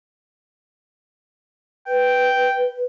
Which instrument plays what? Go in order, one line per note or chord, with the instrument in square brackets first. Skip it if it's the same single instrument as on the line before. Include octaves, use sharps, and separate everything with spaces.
[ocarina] B4 [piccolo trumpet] G5